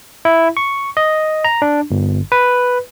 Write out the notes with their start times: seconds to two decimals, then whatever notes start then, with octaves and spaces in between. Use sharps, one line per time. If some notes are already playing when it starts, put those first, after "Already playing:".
0.25 E4
0.57 C#6
0.97 D#5
1.44 A#5
1.62 D4
1.91 G1
2.32 B4